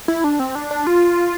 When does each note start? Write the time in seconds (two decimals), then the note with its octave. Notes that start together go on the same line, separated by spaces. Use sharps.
0.08 E4
0.24 D4
0.39 C4
0.55 D4
0.71 D4
0.87 F4